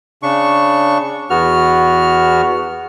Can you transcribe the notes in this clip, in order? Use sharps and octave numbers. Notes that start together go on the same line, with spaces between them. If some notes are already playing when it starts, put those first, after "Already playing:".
C#3 D4 C#6
E2 B3 F#4 F6